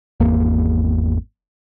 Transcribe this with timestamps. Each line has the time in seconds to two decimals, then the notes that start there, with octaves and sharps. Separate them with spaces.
0.20 G#1 E2 A#3